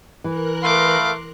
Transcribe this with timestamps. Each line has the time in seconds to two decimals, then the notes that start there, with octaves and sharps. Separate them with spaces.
0.24 E3 A#4 F#6
0.62 A3 B4 F5 C6 D6